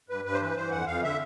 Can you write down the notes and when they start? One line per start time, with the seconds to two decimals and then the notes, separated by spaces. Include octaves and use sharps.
0.09 G2 B4
0.25 G2 B4
0.34 C5
0.41 E3 B4
0.56 E3 C5
0.71 F2 F#5
0.87 F2 F5
1.03 D3 E5